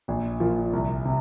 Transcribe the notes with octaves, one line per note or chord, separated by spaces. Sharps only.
A#1
A#2 F3
C2
C3